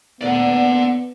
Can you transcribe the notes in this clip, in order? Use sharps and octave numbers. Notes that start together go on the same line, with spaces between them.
D2 A#2 D3 B3 D5 F#5